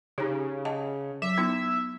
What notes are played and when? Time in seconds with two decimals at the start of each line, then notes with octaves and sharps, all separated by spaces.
0.18 C#3 D#4 G4
0.65 D#5 F#5 A5
1.22 F#3 E5
1.38 B3 D#4 E4